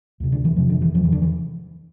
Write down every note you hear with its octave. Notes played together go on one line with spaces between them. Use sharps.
D2 C3
D3
E3
F2 C3 F3
D3
E3
E2 C3 F3
E3
D3
E3